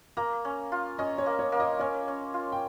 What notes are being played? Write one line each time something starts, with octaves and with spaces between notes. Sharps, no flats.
A#3 A#5
C#4
F4
C#4 D#5
C#5
A#3
C#5
A#3
D#5
C#4 C#5
C#4
F4
G5